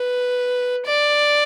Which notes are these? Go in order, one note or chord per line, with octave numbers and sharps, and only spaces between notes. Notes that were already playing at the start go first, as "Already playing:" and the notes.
Already playing: B4
D5